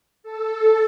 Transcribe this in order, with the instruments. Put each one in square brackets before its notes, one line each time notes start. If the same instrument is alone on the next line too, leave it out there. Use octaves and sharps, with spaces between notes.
[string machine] A4